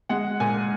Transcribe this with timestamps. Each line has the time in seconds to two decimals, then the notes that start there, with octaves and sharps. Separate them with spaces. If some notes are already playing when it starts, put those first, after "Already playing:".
0.09 G#3 F#5
0.40 A#2 G#5